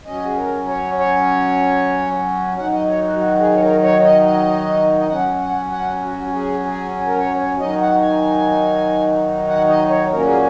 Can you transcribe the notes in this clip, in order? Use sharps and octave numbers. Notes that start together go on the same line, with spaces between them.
F#3 C#4 D#5
G#4
A#4
C#5
C#5
D#3 F#3 D#4 F#5
D#5
C#5
F#4
F#4
G#4
C#5
A#4
C#5
D#5
D#5
D#5
F#3 C#4 F#5
F#5
F#5
F#4
G#4
G#4
A#4
C#5
C#5
D#3 F#3 D#4 D#5
F#5
G#5
F#5
D#5
C#5
A#2 F#3 A#3 C#4 A#4
G#4